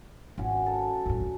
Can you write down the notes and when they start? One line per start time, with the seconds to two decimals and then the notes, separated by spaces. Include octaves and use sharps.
0.38 G#1 C#4 F#4
0.66 A4
1.06 F#2 A2
1.21 D2